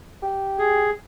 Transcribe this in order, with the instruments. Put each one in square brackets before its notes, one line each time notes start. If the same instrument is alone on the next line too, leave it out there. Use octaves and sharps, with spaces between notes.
[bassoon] G4
[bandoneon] G#4